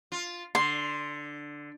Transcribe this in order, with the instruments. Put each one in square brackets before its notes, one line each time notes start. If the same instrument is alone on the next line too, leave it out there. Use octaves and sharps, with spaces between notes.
[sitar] F4
[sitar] D3 [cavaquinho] C6